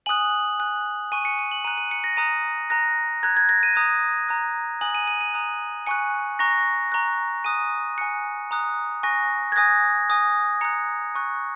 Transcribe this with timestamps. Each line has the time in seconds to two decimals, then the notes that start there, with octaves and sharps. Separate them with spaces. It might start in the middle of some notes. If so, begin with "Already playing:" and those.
0.06 G#5 D#6 F#6 F#7
0.59 G#5 F#6
1.12 G#5 C#6 F#6 D#7
1.25 C#7
1.39 D#7
1.51 F#7
1.64 A#5 F#6 D#7
1.78 D#7
1.91 C#7
2.04 A#6
2.17 A#5 D#6 F#6 D#7
2.70 A#5 F#6 A#6
3.23 A#5 F#6 G#6
3.37 G#6
3.49 A#6
3.63 D#7
3.76 A#5 D#6 F#6
4.29 A#5 D#6 F#6
4.81 G#5 D#6 F#6 F#7
4.95 D#7
5.07 D#7
5.21 D#7
5.34 A#5 D#6 F#6
5.87 G#5 C#6 F#6 C#7
6.39 A#5 C#6 F#6 A#6
6.92 A#5 C#6 F#6
7.44 G#5 D#6 F#6 D#7
7.98 G#5 F#6 C#7
8.51 A#5 D#6 F#6
9.03 G#5 C#6 F#6 A#6
9.52 G#6
9.56 G#5 D#6 F#6 A#6
10.08 G#5 D#6 F#6
10.61 A#5 F#6 C#7
11.15 G#5 C#6 F#6